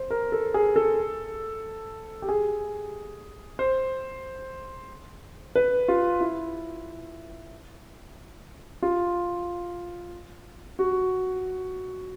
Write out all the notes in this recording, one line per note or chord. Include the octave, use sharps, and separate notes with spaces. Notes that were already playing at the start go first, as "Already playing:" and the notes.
Already playing: C5
A#4
A4
G#4
A4
G4
G#4
C5
B4
F4
E4
F4
F#4